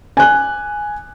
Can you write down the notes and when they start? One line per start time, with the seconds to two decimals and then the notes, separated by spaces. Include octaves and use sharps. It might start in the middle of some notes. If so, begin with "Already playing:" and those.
0.17 G#5 F#6